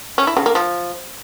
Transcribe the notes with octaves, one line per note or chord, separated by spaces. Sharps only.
C#4
E4
C#3
A#3
F3